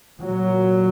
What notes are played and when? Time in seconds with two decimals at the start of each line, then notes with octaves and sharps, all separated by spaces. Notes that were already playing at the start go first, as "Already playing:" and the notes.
0.21 A#2 F#3